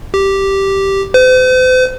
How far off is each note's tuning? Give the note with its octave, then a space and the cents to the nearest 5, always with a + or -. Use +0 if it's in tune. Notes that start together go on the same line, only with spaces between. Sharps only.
G4 -5
C5 -45